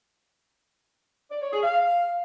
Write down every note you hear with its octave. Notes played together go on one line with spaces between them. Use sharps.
D5
C#5
G#4
F5